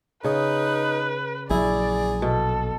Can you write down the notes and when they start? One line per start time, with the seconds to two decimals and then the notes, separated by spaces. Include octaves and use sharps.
0.24 C#3 D#4 B4
1.50 A#1 F#3 E4 G#4 D5
2.22 B2 A4